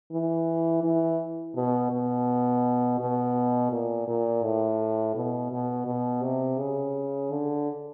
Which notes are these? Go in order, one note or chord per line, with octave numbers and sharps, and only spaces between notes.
E3
E3
B2
B2
B2
A#2
A#2
A2
B2
B2
B2
C3
C#3
D3